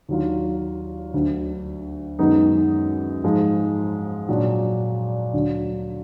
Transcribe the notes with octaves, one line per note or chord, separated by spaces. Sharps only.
D#2 D#3 F#3 D4 F4
D2 D3 F#3
F#2 D#3 G#3 B3 D#4
G#2 F3 G#3
A#2 F#3 D4
D2 D3 F#3